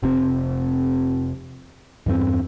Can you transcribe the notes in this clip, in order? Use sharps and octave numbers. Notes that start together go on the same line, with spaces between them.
F1 C3 C4
E2 G2 C4